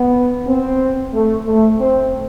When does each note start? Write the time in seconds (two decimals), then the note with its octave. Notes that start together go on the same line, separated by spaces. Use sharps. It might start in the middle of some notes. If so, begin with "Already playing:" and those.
Already playing: B3
0.47 C4
1.13 A3
1.46 A3
1.79 C4